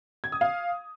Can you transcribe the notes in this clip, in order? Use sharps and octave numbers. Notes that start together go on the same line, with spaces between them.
G#6
D#6
F5